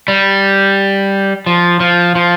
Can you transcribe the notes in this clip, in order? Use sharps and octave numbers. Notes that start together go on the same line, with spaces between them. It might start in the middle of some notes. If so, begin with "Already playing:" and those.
G3
F3
F3
F3